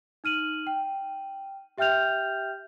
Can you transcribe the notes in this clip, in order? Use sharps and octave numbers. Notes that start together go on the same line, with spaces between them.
D#4 F6 D#7 F#7
G5
G4 E5 G5 F6 G6 F7